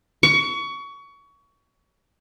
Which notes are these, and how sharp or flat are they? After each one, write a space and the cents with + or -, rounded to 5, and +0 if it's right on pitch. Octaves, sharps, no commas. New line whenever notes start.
C#6 +25